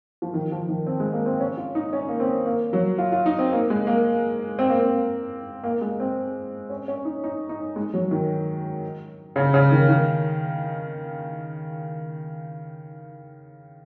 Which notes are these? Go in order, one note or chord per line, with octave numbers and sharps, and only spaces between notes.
F3
D#3
F3
D#3
C4
G#3
A#3
C4
C#4
F4
D#4
C#4
A#3
C4
A#3
F#3
F4
F4
D#4
C4
A#3
G#3
A#3
C4
A#3
C4
A#3
G#3
C4
C#4
C#4
D#4
D#4
D#4
G#3
F#3
D#3
C#3
C#3
D#3
D#3